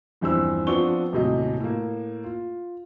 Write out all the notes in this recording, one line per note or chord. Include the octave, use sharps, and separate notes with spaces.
A#1 E2 G2 C4 E4 E6
F3 B3 C4 D4 C#6 G7
D#1 A2 C3 F#3 D#5
A2 A#3
F4